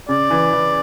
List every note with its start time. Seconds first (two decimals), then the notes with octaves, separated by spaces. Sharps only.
0.09 C#3 D5
0.30 E3
0.52 E3